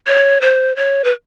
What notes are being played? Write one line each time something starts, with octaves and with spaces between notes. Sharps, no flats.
C#5
C5
C#5
B4